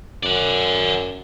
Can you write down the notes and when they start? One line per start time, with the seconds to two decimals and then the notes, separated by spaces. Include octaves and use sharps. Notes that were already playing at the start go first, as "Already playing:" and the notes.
0.23 F#2 D5 F#5